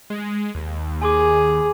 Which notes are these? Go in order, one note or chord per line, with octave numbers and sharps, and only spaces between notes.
G#3
D#2
G#4 G#5 C6 D6